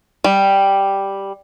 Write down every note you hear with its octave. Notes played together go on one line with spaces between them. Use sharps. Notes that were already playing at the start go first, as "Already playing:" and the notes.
G3